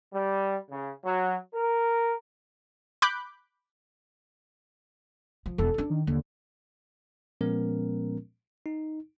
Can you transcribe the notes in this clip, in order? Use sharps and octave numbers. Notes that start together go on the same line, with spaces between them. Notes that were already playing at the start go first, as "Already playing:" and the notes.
G3
C#3
F#3
A#4
B5 D6 F#6 G6
F3
E1 E2 A4
D4 D#4
D#3
D#2 D3
A#2 F3 G#3 B3 C#4 A#4
D#4